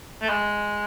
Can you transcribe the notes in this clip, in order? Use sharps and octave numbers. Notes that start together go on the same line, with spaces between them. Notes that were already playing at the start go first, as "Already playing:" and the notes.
A3
G#3